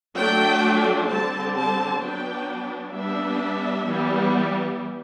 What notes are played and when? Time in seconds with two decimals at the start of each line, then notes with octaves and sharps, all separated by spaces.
0.16 F#3 A3 D4 G5
1.08 D3 G3 C4 A5
1.55 A5
2.00 F#3 B3 D4 G5
2.92 G3 B3 D4 E5
3.85 E3 G3 B3